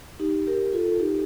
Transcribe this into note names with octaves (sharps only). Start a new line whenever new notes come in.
D#4 G4
G4 A#4
F4 A4
D#4 G4